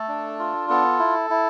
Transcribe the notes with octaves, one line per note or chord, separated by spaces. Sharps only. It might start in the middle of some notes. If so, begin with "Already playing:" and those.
Already playing: A3 A4
D4
F4
B3 A4
E4
E4